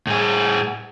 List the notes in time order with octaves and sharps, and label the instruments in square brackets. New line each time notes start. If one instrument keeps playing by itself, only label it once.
[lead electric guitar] A2 G#4